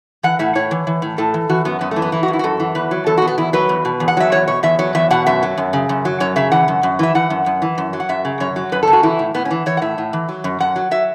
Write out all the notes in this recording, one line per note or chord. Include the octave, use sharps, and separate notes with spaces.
E3 F#5
A2 E5
A2 C#5
E3
E3
A2
A2 A4
E3
E3 F#4
F#2 B3
F#2 B3
A3
E3
B3
E3 E4
F#4
F#2
E4
F#4
F#2 A4
E3
E2 B4
F#3
E2 A4
F#4
B2
B3
E2 E4
F#3 B4
E2
B2
E2
F#5
F#3 E5
E2 C#5
B2 C#5
E2 E5
F#3 C#5
E2 E5
B2 F#5
F#2 E5
F#3
F#2
C#3
F#2
F#3
F#2 C#5
C#3 E5
E3 F#5
F#2
F#2
E3 E5
E3 F#5
F#2
F#2
E3
F#2
F#3
F#5
F#2 E5
C#3
F#2 C#5
F#3
F#2 B4
A4
C#3
F#4
E3 E4
A2
A2 B3
C#4
E3
E3 C#5
F#5
A2 E5
A2
E3
F#3
F#2
F#2 F#5
F#3
F#3 E5